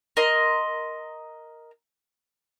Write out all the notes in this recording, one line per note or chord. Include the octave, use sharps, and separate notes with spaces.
A#4 D#5 C6